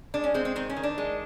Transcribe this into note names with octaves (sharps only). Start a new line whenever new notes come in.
G#3 D4
C#4
G#3 C4
C4
D#3 C4
C#4
D#3
D4
G#3